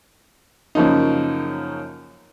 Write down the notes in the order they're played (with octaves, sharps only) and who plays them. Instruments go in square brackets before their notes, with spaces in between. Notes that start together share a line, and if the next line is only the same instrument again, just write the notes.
[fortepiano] F#2 C#3 F3 A#3 D#4